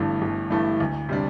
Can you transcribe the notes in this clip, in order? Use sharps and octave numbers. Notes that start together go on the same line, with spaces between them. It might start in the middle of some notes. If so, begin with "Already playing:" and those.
Already playing: G1 G2 E3 A3 E4
G1
G2 E3 A3 E4
D2
C3 G3 D4